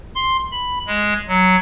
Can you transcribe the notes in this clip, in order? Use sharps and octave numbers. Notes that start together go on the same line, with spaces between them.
C6
B5
G#3
F#3